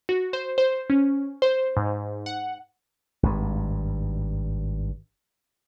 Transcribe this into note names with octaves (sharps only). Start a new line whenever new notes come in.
F#4
C5
C5
C#4
C5
G#2
F#5
G#1 G2